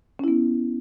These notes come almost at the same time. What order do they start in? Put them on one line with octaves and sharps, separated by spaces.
C#4 E4 B3